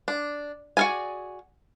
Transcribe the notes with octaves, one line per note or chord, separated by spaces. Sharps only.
D4
F#4 G#4 A#4 D5 G#5